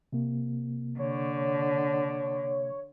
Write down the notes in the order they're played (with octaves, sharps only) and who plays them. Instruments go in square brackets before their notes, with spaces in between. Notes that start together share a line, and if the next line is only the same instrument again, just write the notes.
[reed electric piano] C3 A#3
[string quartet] D3 [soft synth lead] C#5